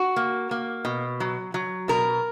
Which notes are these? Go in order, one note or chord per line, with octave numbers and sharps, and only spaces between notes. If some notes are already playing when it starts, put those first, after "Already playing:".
Already playing: F#4
A#3
A#3
B2
F#3
F#3
B2 A#4